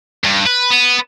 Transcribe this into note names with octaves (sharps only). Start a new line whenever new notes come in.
G2
B4
B3